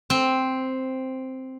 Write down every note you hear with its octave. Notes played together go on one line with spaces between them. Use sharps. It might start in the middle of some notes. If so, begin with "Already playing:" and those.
C4